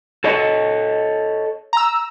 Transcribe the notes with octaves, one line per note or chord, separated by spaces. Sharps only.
A4 C#5 D#5
A#5 E6